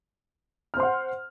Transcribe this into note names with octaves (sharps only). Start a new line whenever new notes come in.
C5 F#5 C6 F6